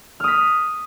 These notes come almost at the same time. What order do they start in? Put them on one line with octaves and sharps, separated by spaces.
F6 D#6 B6